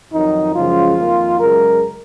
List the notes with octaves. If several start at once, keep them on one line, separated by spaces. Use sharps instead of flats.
F2 D#3 F#3 D#4
F#2 C#3 F3 G#3 F4
F2 D#3 A#3
F#2 C#3 G#3 A#4